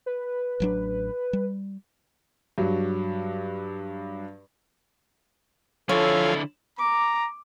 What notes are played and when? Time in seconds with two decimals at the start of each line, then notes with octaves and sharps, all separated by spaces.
0.06 B4
0.60 A1 F#3 D4
1.33 G3
2.58 G2 F#3
5.89 D3 F3 E4 F4 A4 C#5 G#5
6.79 A#5 D6